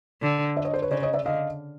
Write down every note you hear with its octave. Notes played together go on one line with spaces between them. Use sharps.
D3
D5 E5
C#5 D#5
C5 D5
B4 C#5
C#3 C5 D5
C#5 D#5
D5 E5
D3 D#5 F5